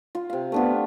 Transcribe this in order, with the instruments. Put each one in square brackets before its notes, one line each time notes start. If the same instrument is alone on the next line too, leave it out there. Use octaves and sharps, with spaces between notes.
[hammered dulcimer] F4
C3 F5
[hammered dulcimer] A3 D4 F4 [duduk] B3